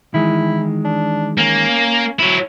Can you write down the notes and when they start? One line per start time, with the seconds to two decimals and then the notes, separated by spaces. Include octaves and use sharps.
0.14 D#3 E3 G#3 E4
0.85 D4
1.38 A#3 C#4
2.19 F#3 E4